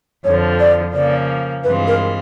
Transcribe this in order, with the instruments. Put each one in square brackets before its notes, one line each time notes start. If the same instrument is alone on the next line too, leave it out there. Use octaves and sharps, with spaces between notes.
[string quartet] F2 D3 F3 [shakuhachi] C#5
[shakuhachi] D5
[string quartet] C#3 F3 A#3 [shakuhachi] D5
[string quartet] G2 E3 G#3 C4 F4 [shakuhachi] B4
[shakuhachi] A#4